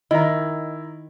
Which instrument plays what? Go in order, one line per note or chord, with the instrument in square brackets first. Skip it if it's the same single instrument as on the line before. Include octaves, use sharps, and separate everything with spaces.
[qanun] D#3 [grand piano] E4 A#5 [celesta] D#5